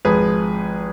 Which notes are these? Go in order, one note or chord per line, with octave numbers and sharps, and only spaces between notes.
G#1 G#2 F3 G#4 B4